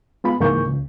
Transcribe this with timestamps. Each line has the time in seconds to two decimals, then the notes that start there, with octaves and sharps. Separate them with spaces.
0.24 G#3 B3 F4 B5
0.40 C#2 G#2 E3 A#3 C#6 G6
0.66 C#2